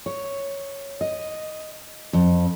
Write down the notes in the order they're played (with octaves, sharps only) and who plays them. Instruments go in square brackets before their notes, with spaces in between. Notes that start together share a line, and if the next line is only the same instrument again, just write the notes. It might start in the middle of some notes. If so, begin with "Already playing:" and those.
[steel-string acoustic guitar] C#5
D#5
F2